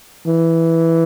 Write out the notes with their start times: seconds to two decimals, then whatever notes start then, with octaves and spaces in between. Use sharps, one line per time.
0.27 E3